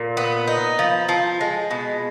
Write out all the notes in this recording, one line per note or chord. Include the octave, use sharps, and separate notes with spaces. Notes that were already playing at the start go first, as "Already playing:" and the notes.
Already playing: A#2
B3
D#4
F3
F3
G#3
B2